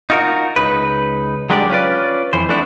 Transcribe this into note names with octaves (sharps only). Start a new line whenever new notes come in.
D#4 F4 F#4 A#4
C#2 D#4 B4
F#3 G#3 D4 G4 A#4 D5
C#4 F4 B4 D5
F2 E3 C5
A3 B3 D4 E4